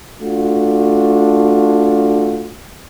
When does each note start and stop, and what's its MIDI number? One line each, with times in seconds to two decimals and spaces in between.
0.21 2.57 57
0.21 2.57 62
0.21 2.57 65
0.21 2.57 66